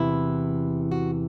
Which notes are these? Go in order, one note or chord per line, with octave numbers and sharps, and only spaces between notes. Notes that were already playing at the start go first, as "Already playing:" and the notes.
Already playing: E2 C3 E3 E4
F#4